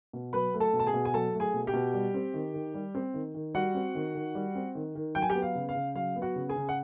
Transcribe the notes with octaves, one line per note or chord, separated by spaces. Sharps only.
B2
F#3 B4 B5
A3
A4 A5
B2
A5
G#4 G#5
B2
G#5
F#3 A4 A5
A3
G#4 G#5
B2
G4 G5
B2
G3
C4
D#3
D#3
G3
C4
D#3
D#3
G3 F#4 F#5
C4
D#3
D#3
G3
C4
D#3
D#3
F#3 G5
G#5
G4 G5
B3
F5
C#3
F5
C#3
F#3 F5
B3
F#4 F#5
C#3
G#4 G#5
C#3
F#5